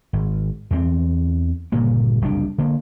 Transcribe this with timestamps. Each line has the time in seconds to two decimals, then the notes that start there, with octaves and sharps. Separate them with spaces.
0.13 G#1
0.71 E2 E3 F#3 C4
1.72 G1 A#2 C#3 A#3
2.22 F#1 C2 F2 D4
2.58 D3 A#3